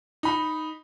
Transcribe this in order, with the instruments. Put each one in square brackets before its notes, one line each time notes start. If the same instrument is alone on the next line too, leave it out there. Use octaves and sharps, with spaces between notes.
[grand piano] D#4 B5